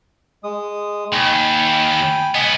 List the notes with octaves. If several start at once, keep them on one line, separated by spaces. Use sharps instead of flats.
G#3 D#6
D#2 G5 G#5 B5
C#2 B3 D#5 G#5